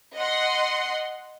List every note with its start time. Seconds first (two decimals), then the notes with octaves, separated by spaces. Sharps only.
0.16 D#5 F#5 C6